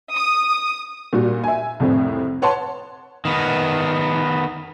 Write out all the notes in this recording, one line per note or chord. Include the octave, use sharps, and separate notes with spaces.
D#6
A#2 G3 F#4
E5 G#5
C2 F2 A2 C4
B4 C#5 F#5 A5 C6
D#3 B3